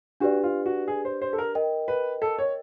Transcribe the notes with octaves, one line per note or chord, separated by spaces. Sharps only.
D4 F#4 G4 B4 D5
F4
F#4
G#4
C5
C5
A4
A#4
A#4 D#5 G5
B4
A4
C#5